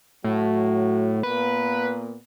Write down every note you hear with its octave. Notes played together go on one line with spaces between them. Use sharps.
A2 F#3 F#4
A#2 A#3 B3 B4